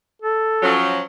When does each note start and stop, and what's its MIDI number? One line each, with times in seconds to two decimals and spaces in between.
0.22 0.75 69
0.62 1.03 53
0.62 1.03 54
0.62 1.03 61